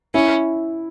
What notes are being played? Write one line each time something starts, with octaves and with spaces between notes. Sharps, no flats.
C#4 E4